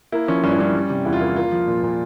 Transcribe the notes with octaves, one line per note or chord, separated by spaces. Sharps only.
A#3 E4
F3 C#4
G2 C#4
E4
G2 C#4
G3
C3
E2 E4
F4
A#3 E4
A#3 F4
F3
A#2
A#2